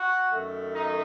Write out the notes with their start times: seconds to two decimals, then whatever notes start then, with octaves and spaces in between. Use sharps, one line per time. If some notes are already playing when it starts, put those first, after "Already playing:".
Already playing: F#4
0.31 F#2 D#3 A3
0.73 D#4